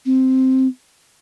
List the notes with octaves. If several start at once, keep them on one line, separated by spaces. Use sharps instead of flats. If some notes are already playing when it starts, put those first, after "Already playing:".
C4